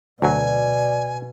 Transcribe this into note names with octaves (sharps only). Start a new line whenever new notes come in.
D2 B2 F#3 D5 G#5